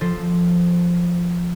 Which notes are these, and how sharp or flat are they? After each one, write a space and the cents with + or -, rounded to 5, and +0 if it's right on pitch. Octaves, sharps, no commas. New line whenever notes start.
F3 +0 A4 +0 C5 +0